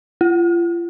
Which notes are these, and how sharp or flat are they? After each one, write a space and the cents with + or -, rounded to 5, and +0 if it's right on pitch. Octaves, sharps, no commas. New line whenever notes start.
F4 -35